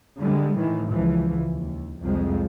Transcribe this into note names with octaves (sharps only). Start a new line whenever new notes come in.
D3 G3 G#3
A2 D#3 E3
C#2 E3 F3
D#2
C2 F2 F3 G#3